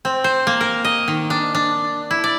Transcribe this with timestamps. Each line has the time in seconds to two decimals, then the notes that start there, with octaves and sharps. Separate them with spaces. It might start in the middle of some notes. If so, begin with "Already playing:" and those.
0.05 C4
0.24 C5
0.47 A#3
0.61 A#4
0.85 D#5
1.08 D#3
1.30 D4
1.55 D4
2.11 E4
2.24 D5